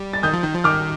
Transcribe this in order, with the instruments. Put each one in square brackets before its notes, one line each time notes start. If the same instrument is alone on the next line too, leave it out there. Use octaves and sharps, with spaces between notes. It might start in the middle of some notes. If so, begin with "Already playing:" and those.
Already playing: [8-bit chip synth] G3
[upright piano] A6
[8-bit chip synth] D#3 [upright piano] D#6 G6
[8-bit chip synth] F3
D#3
F3
[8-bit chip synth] D#3 [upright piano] D6 F6